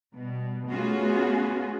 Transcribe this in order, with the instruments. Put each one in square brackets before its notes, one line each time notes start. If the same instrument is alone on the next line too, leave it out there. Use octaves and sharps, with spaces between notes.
[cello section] B2 G3
A3 B3 C#4 F4 F#4 G#4